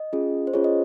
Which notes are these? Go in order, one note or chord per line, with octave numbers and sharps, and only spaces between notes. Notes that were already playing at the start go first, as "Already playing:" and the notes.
Already playing: D#5
C#4 F4 G#4
C5
C#4 F4 G#4 C#5
D#5